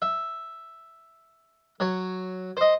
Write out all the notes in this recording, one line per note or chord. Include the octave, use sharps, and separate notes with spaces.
E5
F#3 C#5
C5 D#5